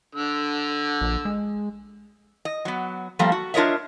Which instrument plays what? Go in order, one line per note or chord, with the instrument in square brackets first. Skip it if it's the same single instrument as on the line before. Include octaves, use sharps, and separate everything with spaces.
[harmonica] D3 E6
[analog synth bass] A#1
G#3
[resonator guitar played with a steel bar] D#5
F#3 B3
F3 G3 A3 A#3
F#4
D4 F4 A#4 C#5 D#5 E5